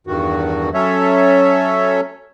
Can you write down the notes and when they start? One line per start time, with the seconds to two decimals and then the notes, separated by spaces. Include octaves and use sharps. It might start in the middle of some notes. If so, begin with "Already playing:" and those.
0.07 E2 G2 D#3 F#4
0.74 F#3 C#4 A4 C#5 E5